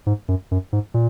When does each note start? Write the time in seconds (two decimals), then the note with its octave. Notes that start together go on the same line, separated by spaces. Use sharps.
0.06 G#2
0.28 F#2
0.51 F#2
0.73 G#2
0.94 A#2